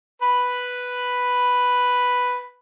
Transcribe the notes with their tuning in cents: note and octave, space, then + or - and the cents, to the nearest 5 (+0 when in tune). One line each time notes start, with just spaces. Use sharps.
B4 +0 B5 +0